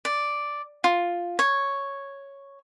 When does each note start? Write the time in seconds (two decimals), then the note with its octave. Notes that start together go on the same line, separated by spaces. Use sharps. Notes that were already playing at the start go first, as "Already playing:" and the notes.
0.05 D5
0.84 F4
1.39 C#5